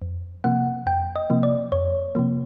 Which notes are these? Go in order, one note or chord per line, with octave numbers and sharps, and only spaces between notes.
F2
C3 F3 A#3 F#5
F2 G5
D#5
C3 F3 A#3
D5
F2 C#5
C3 F3 A#3